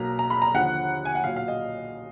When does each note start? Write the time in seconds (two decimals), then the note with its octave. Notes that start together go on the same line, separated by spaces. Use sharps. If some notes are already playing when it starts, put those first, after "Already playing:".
Already playing: B1 B2 F#3 A#3 A#5
0.19 A#5
0.30 B5
0.42 A#5
0.54 D#2 D3 F3 F#5
1.05 G#5
1.15 F#5
1.24 B1 A#2 F#3 F5
1.36 F5
1.48 D#5